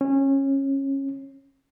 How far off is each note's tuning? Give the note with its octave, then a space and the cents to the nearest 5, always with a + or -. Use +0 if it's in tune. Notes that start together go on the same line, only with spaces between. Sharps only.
C#4 -20